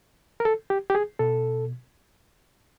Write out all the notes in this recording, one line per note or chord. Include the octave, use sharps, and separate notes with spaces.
A#4
A4
G4
G4
G#4
B2 A4